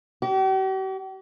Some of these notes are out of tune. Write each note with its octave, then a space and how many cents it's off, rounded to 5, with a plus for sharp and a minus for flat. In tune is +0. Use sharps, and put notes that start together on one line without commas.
G4 -45